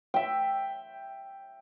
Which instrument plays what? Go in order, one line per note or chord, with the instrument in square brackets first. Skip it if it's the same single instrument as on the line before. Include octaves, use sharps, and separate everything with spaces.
[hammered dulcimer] E5 G5